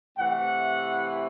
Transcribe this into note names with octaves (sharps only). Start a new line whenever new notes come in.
C3 E3 A3 F#5